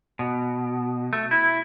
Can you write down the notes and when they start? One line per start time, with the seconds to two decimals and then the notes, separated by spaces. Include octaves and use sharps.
0.19 B2
1.13 A3
1.31 E4